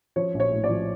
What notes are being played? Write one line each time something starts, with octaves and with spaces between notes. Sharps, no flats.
F3 C#5
A#1
C#5
A2
D5
F3